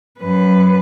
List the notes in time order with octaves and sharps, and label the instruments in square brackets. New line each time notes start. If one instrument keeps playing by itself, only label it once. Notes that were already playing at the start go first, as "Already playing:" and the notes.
[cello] F#2 B4